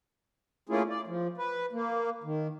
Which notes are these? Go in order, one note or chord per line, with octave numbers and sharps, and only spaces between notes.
A3 A#3 C#4 E4 F4 G#4
D5
F3
B4
A#3
D#3